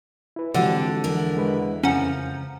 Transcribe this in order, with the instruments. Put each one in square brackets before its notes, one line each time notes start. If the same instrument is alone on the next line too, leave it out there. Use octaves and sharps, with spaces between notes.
[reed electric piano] E4 B4
[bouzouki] D3 [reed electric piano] E3 F3 G#3 [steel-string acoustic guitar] C4 F#4 G4
[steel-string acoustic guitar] E2 E4 A#4
[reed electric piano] G#3 B4
[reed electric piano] F2 C#3 A#5 [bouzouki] F3 [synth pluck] C#4 F#5